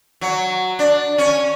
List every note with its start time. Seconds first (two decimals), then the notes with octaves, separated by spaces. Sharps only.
0.21 F#3
0.79 D4
1.18 C#4